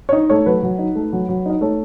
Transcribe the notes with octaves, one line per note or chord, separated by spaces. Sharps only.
C#5
D#4 D#5
A3 C#5
F#3 B4
F#3
D#4
A3
F#3
F#3
D#4 D#5
A3 C#5